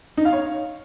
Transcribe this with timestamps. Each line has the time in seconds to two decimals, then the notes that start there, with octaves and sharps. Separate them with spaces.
0.17 D#4
0.25 F5
0.33 C#5